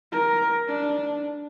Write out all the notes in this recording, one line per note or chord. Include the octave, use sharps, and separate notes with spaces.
A#4
D4